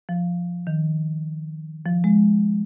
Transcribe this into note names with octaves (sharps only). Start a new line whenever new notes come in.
F3
D#3
F3
G#3